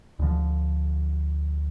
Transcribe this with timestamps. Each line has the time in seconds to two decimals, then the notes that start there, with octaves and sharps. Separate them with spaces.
0.19 D2 D3 F3